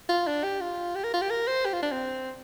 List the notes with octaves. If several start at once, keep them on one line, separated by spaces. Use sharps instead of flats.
F4
D4
G4
F4
G4
A#4
F4
G4
A#4
C5
G4
F4
D4
C4